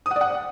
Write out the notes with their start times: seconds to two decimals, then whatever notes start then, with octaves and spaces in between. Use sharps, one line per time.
0.06 D#6
0.11 F#5
0.16 D5
0.21 F#5